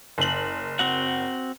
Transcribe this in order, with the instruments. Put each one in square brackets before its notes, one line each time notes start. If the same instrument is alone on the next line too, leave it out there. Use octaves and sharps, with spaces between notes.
[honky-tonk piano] F#1 F#7
[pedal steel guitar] C4 F#4 F#5